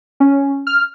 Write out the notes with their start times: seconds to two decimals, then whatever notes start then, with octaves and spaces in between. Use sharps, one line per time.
0.20 C#4
0.67 F6